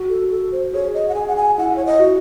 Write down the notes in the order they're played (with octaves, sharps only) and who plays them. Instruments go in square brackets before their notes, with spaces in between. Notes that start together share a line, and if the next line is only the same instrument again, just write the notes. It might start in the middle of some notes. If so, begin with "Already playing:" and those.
Already playing: [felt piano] F#4
[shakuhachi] A4
A4
C5
[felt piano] G#4 [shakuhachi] C#5
[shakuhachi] D#5
F#5
[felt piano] G#4 [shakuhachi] G#5
[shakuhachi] F#5
G#5
[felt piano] E4 [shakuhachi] F#5
[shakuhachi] C#5
D#5
[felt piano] F#4